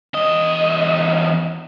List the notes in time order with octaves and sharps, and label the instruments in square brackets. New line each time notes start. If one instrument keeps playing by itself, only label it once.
[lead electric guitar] E2 D#5